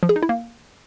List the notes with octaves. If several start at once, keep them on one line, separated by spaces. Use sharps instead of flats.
F3
G#4
D#4
E4
A#3